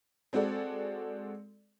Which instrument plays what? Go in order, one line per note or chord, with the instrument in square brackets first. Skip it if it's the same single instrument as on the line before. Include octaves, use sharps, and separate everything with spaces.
[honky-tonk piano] G#3 C4 F#4 A4 D5